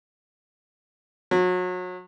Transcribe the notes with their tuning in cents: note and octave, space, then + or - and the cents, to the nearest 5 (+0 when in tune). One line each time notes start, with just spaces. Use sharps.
F#3 -30